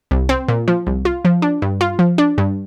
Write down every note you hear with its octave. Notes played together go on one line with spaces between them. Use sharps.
C2
C4
A#2
F3
C2
F4
F3
D4
G2
F4
F3
D4
G2